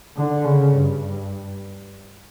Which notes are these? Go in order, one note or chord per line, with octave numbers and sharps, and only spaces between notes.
D3
C#3
G2